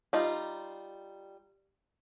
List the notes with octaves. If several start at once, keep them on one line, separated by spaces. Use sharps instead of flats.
G3 D#4 F4